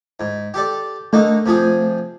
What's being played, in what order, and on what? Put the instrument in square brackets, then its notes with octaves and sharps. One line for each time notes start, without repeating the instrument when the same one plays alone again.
[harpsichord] G#2
G4 A4 D5
[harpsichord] D3 A#3 D#4 [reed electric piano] A3
[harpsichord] C3 F3 G#4